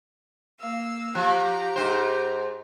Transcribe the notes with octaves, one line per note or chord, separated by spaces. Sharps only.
A#3 F5 E6
F3 G4 A#5
G#2 E3 C5